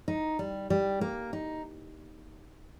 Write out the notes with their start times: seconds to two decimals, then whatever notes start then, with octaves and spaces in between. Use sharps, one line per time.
0.08 D#4
0.39 G3
0.70 G3
1.01 A#3
1.33 D#4